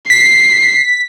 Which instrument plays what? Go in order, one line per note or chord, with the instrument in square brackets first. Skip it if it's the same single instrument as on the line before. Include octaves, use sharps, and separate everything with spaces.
[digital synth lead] B6 [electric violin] C7